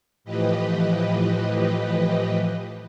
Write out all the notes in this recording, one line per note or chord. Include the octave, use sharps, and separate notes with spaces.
A2 E3 F3 G4 B4 D#5